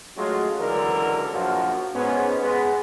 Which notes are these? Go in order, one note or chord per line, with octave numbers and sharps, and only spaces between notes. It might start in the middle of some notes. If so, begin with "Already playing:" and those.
F#3 G#3 A3 C#4 F4 F#4
C#2 D3 E3 F#3 D4 A#4
A#1 F#2 F3 A#3 F#4
G#2 B3 C#4
G#3 B3